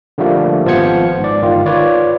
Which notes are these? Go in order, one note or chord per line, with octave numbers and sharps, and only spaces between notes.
D3 F3 G3 A3 A#3
G#1 F3 B3 C5 G#6 C#7
G#2 D5
G1 D#3 F4
F4 B4 C#5 D5